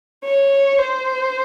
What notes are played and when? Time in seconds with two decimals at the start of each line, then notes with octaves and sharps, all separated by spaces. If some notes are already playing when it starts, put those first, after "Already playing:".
0.24 C#5
0.79 C5